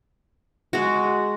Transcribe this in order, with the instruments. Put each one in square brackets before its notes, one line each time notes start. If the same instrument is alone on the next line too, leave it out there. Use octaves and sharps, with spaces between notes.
[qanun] G#3 F#4